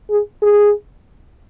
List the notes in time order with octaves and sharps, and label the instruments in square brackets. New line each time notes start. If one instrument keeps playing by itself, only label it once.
[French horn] G#4
G#4